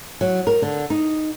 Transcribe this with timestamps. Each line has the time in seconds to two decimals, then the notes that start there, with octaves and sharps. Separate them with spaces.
0.21 F#3
0.47 A#4
0.62 D3
0.90 D#4